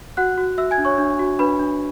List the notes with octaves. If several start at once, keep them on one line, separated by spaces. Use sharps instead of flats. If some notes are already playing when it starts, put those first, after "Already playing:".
F#4 F#5 F#6
F#4
F#4 E5 E6
G#5 G#6
D4
C#5 C#6
D4
F#4
D4 B4 B5
D4